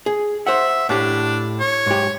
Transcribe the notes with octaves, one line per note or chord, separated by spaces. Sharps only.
G#4
C5 E5 F#5
A2 D4 G4
C#5
G#2 G4